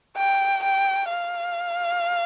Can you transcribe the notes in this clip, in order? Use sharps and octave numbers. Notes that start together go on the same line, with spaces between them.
G5
G5
F5